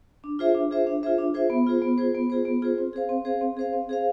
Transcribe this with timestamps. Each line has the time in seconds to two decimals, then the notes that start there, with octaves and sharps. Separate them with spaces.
0.24 D4
0.39 F4 G#4 C5 E5
0.55 D4
0.71 F4 G#4 C5 E5
0.87 D4
1.03 F4 G#4 C5 E5
1.18 D4
1.34 F4 G#4 C5 E5
1.50 B3
1.67 F4 G#4 C5
1.82 B3
1.98 F4 G#4 C5
2.15 B3
2.30 F4 G#4 C5
2.45 B3
2.62 F4 G#4 C5
2.78 C4
2.93 G#4 C5 F5
3.09 C4
3.25 G#4 C5 F5
3.41 C4
3.57 G#4 C5 F5
3.73 C4
3.89 G#4 C5 F5